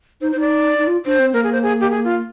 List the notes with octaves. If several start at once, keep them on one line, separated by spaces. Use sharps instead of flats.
D#4 C5
C5
D#4 D5
D#4
F4
D4 C5
C4
A#3 A#4
G#4
C5
G#4
G4
G#4
F4